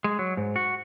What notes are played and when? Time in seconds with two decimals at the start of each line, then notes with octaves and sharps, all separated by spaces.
0.04 G#3
0.19 F#3
0.37 G#2
0.56 F#4